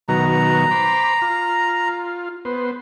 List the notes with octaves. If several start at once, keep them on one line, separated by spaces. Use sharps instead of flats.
B2 D#3 F#3 A#5
C5 B5 D6
F4
B3 C5